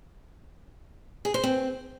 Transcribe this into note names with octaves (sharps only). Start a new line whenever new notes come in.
G#4
C5
C4